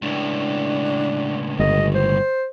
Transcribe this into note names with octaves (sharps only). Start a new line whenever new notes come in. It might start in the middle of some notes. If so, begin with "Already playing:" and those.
C#2 A2 D4
G1 D#5
C5